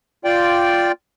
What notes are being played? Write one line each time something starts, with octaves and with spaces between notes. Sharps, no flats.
F4 D5 G5